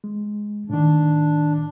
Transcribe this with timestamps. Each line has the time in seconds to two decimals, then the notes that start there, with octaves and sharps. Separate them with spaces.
0.04 G#3
0.70 A2 D#3 D4